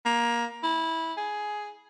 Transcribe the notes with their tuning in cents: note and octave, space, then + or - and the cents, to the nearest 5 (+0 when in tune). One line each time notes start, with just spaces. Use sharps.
A#3 +20
E4 -20
G#4 +10